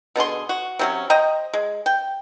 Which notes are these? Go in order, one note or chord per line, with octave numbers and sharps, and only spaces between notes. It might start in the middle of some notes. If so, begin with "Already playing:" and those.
B2 D3 G#4 C6
F#4
C3 F#3 C#4
C5 D#5 G5 A#5
G#3
G5